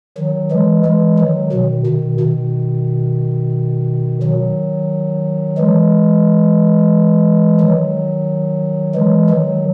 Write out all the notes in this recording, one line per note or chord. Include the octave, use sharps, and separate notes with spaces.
D#3 F#3
E3 G#3
E3 G#3
D#3 F#3
B2 D#3
B2 D#3
B2 D#3
D#3 F#3
E3 G#3
D#3 F#3
E3 G#3
D#3 F#3